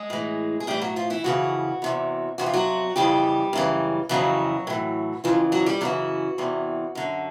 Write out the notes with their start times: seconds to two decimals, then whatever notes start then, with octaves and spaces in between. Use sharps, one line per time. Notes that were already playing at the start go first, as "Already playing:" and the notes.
Already playing: G#3 G#4
0.10 A2 E3
0.60 G#4
0.67 A2 E3 G3 G4
0.82 F#3 F#4
0.96 F3 F4
1.10 E3 E4
1.24 F2 C#3 E3 F#3 F#4
1.82 E2 C3 E3
2.38 F2 C3 E3 F#4
2.46 F4
2.54 F#3 F#4
2.96 F2 C#3 E3 G3 G4
3.53 F#2 C#3 E3
4.09 F2 C#3 E3 F#3 F#4
4.67 A2 E3
5.24 F2 C#3 E3 F3 F4
5.52 F#3 F#4
5.66 G3 G4
5.81 F#2 C#3 E3 F#3 F#4
6.38 E2 C3 E3
6.95 F#2 D3